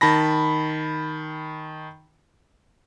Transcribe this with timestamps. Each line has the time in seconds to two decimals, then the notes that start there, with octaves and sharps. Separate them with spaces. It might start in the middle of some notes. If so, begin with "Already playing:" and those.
0.01 D#3 A5 B5 A#6